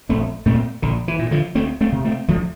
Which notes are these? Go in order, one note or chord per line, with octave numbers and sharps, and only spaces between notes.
A#1 A3 C4
A#2 A3 C4
A#1 D3
E3
A#2
D3 F3
D2 A3 C4
A3 C4
C3
A3 C4
D2 F3 A3